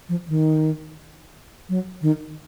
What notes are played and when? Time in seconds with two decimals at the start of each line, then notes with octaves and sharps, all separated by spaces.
0.09 F3
0.28 D#3
1.69 F#3
2.02 D#3